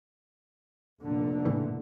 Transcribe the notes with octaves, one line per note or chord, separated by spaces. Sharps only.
F1 A#2 D3
A2 C#3 E3